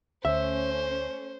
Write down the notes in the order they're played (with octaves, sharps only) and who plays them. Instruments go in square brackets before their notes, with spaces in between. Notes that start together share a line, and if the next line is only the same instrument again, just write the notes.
[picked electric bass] D2 [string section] A3 C#4 [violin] C5 [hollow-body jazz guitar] E5